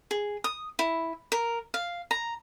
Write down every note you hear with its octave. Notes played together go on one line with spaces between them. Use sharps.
G#4
D#6
E4
A#4
F5
A#5